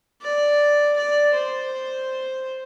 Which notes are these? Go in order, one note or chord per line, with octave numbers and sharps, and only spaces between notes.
D5
D5
C5